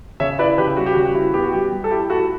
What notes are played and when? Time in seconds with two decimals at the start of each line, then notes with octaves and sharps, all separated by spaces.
0.20 C#3 C#5 E5
0.39 E4 B4 D5
0.58 C#3 G4 B4
0.76 G3 F#4
0.86 G4
0.94 C#3 F#4
1.05 F#4
1.15 E4
1.34 B3 G4
1.43 F#4
1.53 G3 G4
1.72 G3
1.84 A4
1.91 E4 G4
2.10 E4 F#4 A4